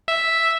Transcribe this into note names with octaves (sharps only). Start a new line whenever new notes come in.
E5